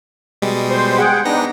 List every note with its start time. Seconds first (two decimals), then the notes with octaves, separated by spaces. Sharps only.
0.42 B2 G3 G#3
0.70 C5 C6
0.98 G#4 F#5 G5
1.25 B3 D4 D#4 A#6